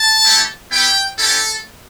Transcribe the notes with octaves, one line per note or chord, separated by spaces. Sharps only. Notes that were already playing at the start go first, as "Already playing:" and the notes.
Already playing: A5
A3 E4 G4
B3 E4 G4 G5
C#4 E4 G4 A4